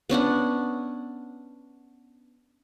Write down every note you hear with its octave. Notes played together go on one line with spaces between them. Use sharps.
B3 C#4 D4 F#5